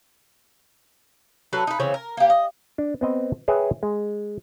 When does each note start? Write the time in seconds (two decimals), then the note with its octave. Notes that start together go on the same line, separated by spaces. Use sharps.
1.53 F#3 A4 B4
1.67 D#4 B4
1.80 C#3 E3 C4 C#5
1.94 A#4
2.17 A#3 G4
2.30 D#5
2.78 D4
3.01 B3 C4 D#5
3.48 G#4 B4 C#5 E5 G5 G#5
3.83 G#3